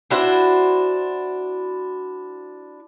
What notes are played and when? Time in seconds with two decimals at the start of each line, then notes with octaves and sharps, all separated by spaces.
0.10 D4 E4 F#4 C5